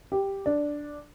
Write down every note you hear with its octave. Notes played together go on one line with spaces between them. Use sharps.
G4
D4